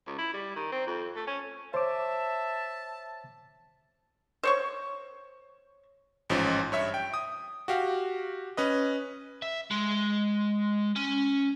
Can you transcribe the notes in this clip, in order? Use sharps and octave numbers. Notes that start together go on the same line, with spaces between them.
C#2
E4
G3
D#3
C4
F2
A3
C#4
C5 C#5 E5 A5 D6
C5 C#5 C#6
A1 G#2 F3 C#4
G2 C#5 E5 E6
G5
D#6
F#4 G4 F5
C#4 B4 D#5
E5
G#3
C#4